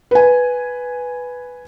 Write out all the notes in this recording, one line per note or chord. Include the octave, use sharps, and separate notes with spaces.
B4 G#5